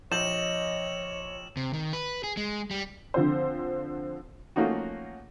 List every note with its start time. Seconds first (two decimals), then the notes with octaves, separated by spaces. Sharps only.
0.12 A#1 C#5 D#5 G6 E7 F#7
1.57 C3
1.73 D#3
1.93 B4
2.24 G#4
2.37 G#3
2.71 G3
3.14 D3 F3 C4 C5
4.56 F3 A3 A#3 C#4 D#4 F#4